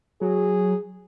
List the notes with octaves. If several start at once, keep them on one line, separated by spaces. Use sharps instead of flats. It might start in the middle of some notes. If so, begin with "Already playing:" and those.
F#3 G#4